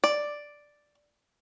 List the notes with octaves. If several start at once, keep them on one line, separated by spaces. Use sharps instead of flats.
D5